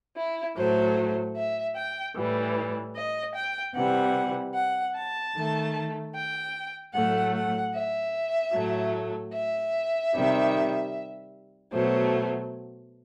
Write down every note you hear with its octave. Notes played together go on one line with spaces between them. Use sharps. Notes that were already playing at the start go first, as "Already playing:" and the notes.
E4
A2 F#3 A3 C5
E5
G5
A2 E3 G3
D#5
G5
C3 E3 G3 F#5
F#5
A5
D#3 A3
G5
A2 F#3 A3 F#5
F#5
E5
A2 F#3 A3
E5
C3 D#3 G3
B2 F#3 A3 C5